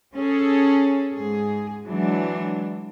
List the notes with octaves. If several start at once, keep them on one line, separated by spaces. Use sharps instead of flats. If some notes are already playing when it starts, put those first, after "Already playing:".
C#4 G#4 A4
G#2 G#4
E3 F#3 G#3 D4